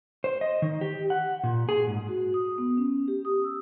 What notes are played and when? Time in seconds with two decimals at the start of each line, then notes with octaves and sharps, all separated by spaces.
0.24 C5
0.41 D#5
0.62 D#3
0.81 G4
1.10 F#5
1.44 A#2
1.69 G#4
1.87 G#2
2.08 F#4
2.34 D#6
2.58 B3
2.77 C#4
3.08 G4
3.25 D#6
3.44 E6